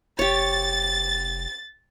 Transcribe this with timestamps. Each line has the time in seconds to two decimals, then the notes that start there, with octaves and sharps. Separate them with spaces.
0.19 F1 G4 C#5 A6